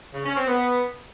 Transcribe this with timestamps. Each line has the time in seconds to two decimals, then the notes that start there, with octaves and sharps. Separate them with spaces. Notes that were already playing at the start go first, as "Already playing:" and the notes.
0.14 C#3
0.25 C#4
0.36 C4
0.48 B3